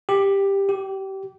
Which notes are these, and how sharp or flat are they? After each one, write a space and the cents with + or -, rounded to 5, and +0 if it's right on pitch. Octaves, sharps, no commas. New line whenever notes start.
G4 +10
G4 -25